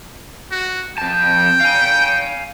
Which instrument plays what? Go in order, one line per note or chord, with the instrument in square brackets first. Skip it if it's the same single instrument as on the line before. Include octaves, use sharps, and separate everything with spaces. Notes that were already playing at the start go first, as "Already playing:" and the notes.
[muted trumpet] F#4
[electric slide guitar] F2 A5 [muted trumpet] G5
[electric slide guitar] F5 G#5